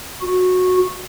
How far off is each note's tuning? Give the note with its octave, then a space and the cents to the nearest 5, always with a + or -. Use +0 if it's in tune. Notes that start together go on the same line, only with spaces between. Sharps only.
F#4 -15